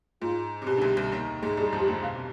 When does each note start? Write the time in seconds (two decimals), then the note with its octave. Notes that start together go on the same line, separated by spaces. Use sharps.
0.22 G#2 F4
0.62 C3
0.67 B2 G4
0.77 D3
0.82 C2 C3
0.97 C2 C3
1.12 D#2 D#3
1.42 G#2 G#3
1.57 G2 G3 G#4
1.72 F2 F3
1.80 G4
1.88 D2 D3
2.03 B2 F5
2.15 C3